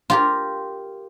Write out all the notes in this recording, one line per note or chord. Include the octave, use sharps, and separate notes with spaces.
F4 G4 A#4